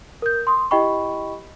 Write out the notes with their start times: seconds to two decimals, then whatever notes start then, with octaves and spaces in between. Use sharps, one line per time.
0.22 A#4 G6
0.47 C6 D#6
0.71 E4 G4 D#5 G5 B5 C#6